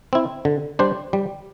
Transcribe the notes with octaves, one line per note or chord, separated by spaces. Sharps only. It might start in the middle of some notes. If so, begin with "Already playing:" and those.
C4 E4
D3
G3 D4 C5
G3